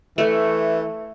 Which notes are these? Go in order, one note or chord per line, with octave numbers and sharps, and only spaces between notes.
E3 A3